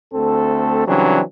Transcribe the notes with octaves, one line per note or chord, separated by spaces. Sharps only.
D2 A3 C4 A4
C#3 E3 F#3 G3 C4 D4